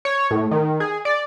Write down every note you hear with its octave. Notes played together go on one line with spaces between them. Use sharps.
C#5
A2
D#3
G#4
D5